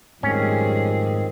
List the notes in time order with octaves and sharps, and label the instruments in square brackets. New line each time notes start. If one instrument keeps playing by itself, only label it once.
[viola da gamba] F2 G3 G#4 [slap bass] G#2 A3 [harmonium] D#3 C4 [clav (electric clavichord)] C#4